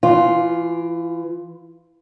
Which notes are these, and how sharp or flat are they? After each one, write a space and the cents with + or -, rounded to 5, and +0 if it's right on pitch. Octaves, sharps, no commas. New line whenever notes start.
E3 +25 F4 +0